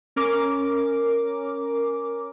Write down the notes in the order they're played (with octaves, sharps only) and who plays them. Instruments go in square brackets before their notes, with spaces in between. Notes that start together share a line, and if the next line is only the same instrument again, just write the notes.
[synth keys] C#4 A#4 D6